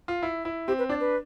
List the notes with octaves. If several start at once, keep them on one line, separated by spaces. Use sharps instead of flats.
F4
E4
E4
C4 G4
B4
D4 D5
B4